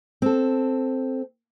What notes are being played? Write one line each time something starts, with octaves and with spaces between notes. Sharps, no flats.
C4 A4